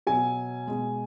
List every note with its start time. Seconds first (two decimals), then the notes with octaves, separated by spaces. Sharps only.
0.07 B2 F#3 G#5
0.67 B2 G#3